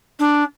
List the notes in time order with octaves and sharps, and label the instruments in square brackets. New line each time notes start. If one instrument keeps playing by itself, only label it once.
[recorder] D4